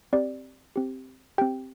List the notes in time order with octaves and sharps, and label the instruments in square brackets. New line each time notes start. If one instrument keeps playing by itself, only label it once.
[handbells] C4 G4 D5
C4 G4
C4 G4 G5